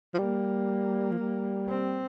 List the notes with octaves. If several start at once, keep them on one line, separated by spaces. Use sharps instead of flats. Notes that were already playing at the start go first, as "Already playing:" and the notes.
F3
G3 A#3
F3
G3
C4